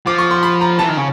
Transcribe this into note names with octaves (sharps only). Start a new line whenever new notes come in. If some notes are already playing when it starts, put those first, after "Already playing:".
F3 D6
C#6
C6
B5
A#5
E3 A5
D#3
C#3